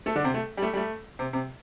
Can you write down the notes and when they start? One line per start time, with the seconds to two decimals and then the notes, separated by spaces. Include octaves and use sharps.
0.06 A3 A4
0.16 D3 D4
0.24 C3 C4
0.34 A3
0.57 G3
0.62 A3
0.73 G3
0.77 A3
1.19 C3 C4
1.33 C3 C4